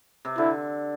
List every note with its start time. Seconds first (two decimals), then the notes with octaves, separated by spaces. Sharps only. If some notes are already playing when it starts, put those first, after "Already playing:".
0.25 C3
0.38 D3 E4